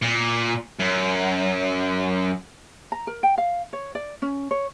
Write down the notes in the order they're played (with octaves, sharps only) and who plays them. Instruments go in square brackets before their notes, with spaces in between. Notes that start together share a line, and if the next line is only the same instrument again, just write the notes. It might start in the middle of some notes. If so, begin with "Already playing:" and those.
[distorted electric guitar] A#2
F#2
[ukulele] A#5
A#4
G5
F5
C#5
D5
C#4
C#5